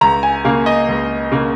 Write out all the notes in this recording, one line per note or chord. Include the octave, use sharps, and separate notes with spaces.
C#2 A#5
G#5
C#3 A#3 F5
D#5
C#2
C#3 A#3